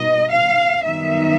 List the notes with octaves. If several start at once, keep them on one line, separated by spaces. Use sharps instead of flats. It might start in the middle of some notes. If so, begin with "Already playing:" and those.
Already playing: B2 G3 B3 D#4 D#5
F5
F#2 D#3 G3 B3 D#4 E5